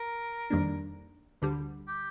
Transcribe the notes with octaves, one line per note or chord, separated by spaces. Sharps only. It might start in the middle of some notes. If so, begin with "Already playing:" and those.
Already playing: A#4
F2 D#3 G3 A#3 D4
D2 D3 G3
G4